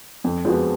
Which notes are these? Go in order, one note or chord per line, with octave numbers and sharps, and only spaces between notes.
F2
F3 G#3 B3 F#4